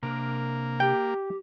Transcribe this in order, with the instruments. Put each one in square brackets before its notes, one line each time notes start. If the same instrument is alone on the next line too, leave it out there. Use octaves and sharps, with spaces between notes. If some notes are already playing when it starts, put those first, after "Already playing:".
[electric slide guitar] C3 D4 A#4 [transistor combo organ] A#3
[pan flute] G4 [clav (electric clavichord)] G5